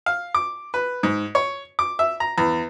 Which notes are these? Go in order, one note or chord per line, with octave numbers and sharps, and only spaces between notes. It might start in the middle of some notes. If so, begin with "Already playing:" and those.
F5
D6
B4
G#2
C#5
D6
E5
A#5
E2